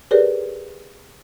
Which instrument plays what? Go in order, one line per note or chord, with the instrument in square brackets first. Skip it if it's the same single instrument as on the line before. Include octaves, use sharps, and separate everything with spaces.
[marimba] G4 G#4 A#4 B4 C#5 D5